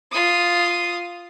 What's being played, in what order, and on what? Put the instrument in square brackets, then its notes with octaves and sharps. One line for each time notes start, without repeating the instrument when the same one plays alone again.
[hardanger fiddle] F4 D#6